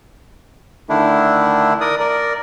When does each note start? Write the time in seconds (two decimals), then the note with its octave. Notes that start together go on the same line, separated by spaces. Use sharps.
0.89 D3 D#3 A3 D4 E4
1.81 A#4 D5 D#6
2.00 A#4 D5